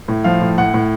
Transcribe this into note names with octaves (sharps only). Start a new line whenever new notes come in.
A2
F3 F5
A2
A2 F#5
A2